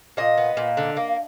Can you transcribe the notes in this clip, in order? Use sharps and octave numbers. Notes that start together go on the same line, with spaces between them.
A#2 D#5
B3
A#2
D3
A#3